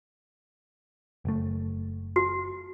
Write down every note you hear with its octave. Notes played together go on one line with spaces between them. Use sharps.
F#1 A3
F#4